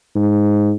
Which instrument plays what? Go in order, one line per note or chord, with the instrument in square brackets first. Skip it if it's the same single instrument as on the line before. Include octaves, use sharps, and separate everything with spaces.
[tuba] G#2